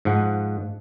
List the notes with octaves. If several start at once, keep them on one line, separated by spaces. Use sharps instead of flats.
G#2 F3 F#5